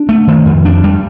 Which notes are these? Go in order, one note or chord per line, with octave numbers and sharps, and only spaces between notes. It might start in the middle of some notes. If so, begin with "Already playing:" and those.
Already playing: D4
A3
D#3
F2
D4
G3